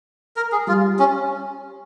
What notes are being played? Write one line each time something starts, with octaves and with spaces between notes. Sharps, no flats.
A#4
G#4
G3 F4
C#4